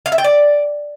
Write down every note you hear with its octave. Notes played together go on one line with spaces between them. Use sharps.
F5
E5
G5
D5